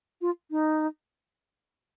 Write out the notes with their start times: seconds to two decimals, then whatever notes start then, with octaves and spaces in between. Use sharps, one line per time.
0.21 F4
0.51 D#4